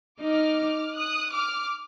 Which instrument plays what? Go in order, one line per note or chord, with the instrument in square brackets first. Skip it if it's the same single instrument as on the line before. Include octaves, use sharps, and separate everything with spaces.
[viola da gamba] D#4 [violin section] D6 F6
[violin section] D#6 F#6
D6 F6